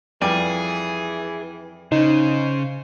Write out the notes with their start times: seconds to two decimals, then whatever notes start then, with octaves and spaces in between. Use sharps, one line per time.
0.22 F2 E3 G3 G#4 D5
1.92 C#3 D#4 C5